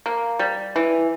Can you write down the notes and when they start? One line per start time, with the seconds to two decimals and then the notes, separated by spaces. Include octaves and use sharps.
0.06 A#3
0.39 G3
0.76 E3